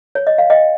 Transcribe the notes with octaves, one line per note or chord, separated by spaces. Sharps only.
C#5
D#5
F5
D#5 G5